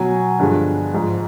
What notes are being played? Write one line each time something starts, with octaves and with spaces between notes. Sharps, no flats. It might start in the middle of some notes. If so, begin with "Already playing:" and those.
Already playing: B2 F#3 G#5
G2 D3 F3 G#3
G#2 F3 G#3